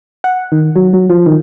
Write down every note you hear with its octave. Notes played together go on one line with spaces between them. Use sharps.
F#5
D#3
F#3
F#3
F3
D#3